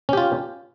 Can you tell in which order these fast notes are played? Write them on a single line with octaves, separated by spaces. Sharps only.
C#4 G4 F4